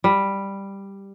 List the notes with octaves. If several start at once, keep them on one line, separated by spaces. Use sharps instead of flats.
G3